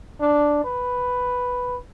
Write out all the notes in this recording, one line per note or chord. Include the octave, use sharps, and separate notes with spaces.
D4
B4